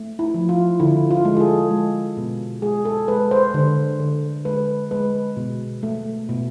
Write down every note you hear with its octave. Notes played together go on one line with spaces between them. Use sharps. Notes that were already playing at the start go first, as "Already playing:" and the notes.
Already playing: A3
E4
F3
F4
D3 E4
F4
G#3
G#4
A4
G#3
B2
G#3 G#4
A4
G#3 B4
C5
D3
D3
G#3 B4
G#3 B4
B2
A3
B2